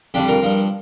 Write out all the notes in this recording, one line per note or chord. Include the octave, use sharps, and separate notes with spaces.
F2 D3 G3 D4 G4
F4 A#4
G2 F3